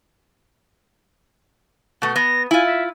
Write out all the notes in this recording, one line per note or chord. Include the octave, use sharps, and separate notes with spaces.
B2 A3
B3 A#6
E4 F4 G#5
E5